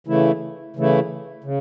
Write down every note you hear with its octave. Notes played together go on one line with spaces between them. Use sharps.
C#3 E3 A3 E4
C#3 E3 A3 E4
C#3